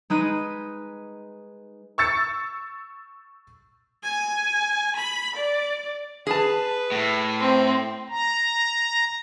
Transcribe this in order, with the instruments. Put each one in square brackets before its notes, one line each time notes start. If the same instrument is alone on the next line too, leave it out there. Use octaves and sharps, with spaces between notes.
[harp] G#3 D#4 B4 D#7
[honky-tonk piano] C#6 E6 A6 C#7
[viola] G#5
B5
D5
[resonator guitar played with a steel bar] G#4 A5 [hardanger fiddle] B4
[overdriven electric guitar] A2
[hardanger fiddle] C4
[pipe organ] A#5